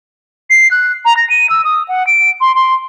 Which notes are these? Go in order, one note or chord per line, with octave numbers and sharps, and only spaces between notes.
C7
F#6
A#5
A#6
D#7
E6
D#6
F#5
D7
C6
C6